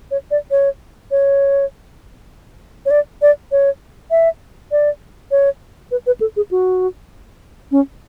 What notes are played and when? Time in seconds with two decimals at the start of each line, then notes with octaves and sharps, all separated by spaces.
0.11 C#5
0.31 D5
0.51 C#5
1.11 C#5
2.86 C#5
2.91 D5
3.22 D5
3.52 C#5
4.11 E5
4.72 D5
5.31 C#5
5.91 B4
6.07 B4
6.21 A4
6.36 G#4
6.51 F#4
7.71 C#4